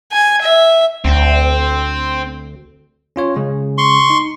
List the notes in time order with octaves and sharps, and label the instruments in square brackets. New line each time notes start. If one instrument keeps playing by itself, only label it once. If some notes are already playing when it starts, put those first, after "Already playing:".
[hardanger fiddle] G#5
E5
[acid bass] D2 [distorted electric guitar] C4
[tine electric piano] C#4 F4 C#5
C#3 G#3 C#4
[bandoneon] C6 C#6
[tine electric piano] D#4